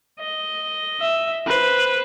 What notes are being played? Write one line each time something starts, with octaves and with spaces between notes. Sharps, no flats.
D#5
E5
B4 C5